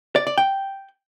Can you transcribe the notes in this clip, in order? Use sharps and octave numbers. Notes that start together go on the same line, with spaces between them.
D5
D5
G5